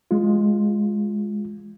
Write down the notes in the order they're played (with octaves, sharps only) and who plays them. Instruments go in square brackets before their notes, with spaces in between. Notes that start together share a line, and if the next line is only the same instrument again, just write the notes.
[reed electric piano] G#3 F4